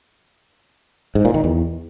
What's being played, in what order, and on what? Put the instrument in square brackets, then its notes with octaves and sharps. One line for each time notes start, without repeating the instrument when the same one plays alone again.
[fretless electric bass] G#2
A#2
D#3
E2